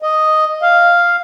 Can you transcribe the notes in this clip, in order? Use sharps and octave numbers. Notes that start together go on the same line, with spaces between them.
D#5
F5